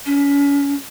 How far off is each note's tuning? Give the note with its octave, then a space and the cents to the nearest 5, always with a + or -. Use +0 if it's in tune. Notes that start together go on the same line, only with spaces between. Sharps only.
C#4 +30